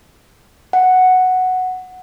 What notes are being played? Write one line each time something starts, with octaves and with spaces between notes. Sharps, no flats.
F#5